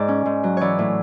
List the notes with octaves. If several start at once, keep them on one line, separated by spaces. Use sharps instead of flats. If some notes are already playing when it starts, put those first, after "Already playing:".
Already playing: G#2 D5
C#4
G#2
F#3
E3 C#5 D5
A2